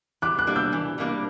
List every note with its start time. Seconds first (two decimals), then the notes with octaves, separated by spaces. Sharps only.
0.22 E3 D6 F#6
0.39 D6 F#6
0.47 G3 A#3 D4
0.56 E6 G6
0.72 E3
0.98 G3 A#3 D4